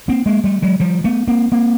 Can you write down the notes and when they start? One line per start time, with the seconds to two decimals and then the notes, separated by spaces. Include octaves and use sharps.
0.08 A#3 C4
0.26 G#3 A#3
0.44 G3 A3
0.62 F#3 G#3
0.80 F3 G3
1.04 A3 B3
1.27 A#3 C4
1.52 A#3 C4